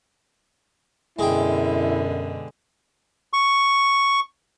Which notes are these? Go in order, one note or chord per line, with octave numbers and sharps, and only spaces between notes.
F#2 B2 D3 G#3 E4 G5
C#6